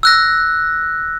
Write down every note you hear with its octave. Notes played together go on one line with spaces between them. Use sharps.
E6 F#6 A#6